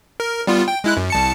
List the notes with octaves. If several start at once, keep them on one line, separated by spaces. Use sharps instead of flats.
A#4
G3 B3 F4
G5
G#3 E4 F#6
F#2
C2 A5 C#7